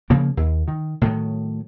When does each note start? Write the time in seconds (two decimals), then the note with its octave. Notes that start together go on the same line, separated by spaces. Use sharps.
0.10 C#3 F3 A#3
0.37 D#2
0.68 D#3
1.01 A2 D#3 F#3